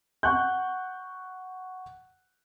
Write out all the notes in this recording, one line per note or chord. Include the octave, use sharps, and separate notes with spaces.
F#5 C#6 F#6 G6